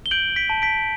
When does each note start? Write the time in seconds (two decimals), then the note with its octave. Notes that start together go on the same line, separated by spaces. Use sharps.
0.06 G7
0.11 G6 D7 F#7
0.36 B6 D7
0.50 A5
0.62 B6 D7